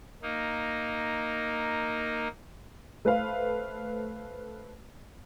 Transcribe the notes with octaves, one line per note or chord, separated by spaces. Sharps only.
A#3 D#4
A3 B4 C5 F5